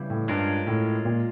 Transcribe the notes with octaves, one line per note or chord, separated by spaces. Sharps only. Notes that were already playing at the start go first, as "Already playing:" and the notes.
Already playing: C#3 E3 G3 C4 E4
A2
G2 G#3 C#4 F4 A#4
A2
A#2